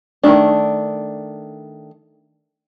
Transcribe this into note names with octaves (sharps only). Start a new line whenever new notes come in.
D#3 F#3 A3 D4